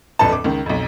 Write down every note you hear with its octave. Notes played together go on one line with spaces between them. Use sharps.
D1 A#1 F2 A4 B4 A5
D6
C#2 D#3
B1 F2